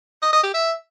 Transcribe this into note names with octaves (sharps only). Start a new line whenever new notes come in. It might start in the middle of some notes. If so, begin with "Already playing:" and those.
D#5
D#5
G4
E5